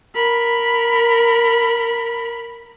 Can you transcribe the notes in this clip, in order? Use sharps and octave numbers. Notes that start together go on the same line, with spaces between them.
A#4 B5